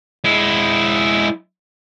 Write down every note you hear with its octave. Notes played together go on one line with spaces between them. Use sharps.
G#3 E4